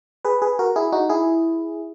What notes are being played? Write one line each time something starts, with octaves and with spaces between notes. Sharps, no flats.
G#4 B4
G#4 B4
F#4 A#4
E4 G#4
D#4 F#4
E4 G#4